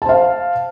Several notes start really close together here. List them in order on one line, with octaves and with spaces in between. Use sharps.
A5 C5 F5